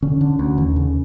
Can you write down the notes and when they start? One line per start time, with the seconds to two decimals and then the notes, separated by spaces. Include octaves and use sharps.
0.02 D3 C#4
0.21 D3
0.39 D2
0.58 D#2
0.76 C#3